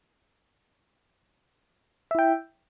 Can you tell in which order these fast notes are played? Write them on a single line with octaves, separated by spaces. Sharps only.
E5 E4 G5